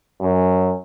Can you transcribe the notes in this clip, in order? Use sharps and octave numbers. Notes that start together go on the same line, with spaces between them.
F#2